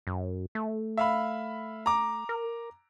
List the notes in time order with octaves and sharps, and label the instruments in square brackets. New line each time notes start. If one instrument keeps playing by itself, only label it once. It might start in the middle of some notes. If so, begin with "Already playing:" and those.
[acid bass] F#2
A3
[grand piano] E5 F5 B5
A#5 D6
[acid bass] A#4